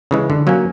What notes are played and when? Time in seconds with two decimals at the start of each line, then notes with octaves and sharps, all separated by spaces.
0.11 C#3 E3 G#3
0.30 D3
0.47 F#3 A#3 C#4